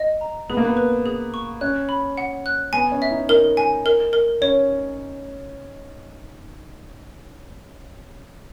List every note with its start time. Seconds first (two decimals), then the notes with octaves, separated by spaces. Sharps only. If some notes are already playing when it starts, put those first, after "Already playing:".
Already playing: D#5
0.21 A#5
0.49 B3 G#4
0.57 A#3
0.65 B3
0.77 B4
1.06 G#4
1.34 C#6
1.61 C#4 F#6
1.89 B5
2.18 F#5
2.46 F#6
2.73 B3 G#5
2.92 C#4
3.02 E5
3.11 D#4
3.29 D#4 A#4
3.57 G#5
3.86 A#4
4.13 A#4
4.41 C#4 C#5